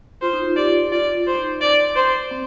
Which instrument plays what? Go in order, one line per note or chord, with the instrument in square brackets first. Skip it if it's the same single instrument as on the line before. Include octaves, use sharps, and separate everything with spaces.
[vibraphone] F4 [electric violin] C5
[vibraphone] D#4
F4
[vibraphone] G4 [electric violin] D5
[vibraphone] F4 [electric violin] D5
[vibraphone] D#4 [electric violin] C5
[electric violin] D5
C5
[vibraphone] C4